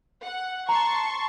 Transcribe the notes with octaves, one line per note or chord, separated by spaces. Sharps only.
F#5
A5 A#5 C6 C#6